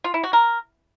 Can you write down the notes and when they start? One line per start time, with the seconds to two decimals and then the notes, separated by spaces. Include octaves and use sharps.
0.04 F4
0.14 E4
0.23 F#4
0.33 A#4